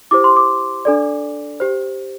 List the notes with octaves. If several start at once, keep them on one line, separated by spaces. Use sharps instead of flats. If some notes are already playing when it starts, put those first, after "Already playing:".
E4 G4 C5 D6
C6
D6
D4 A4 D5
G4 C5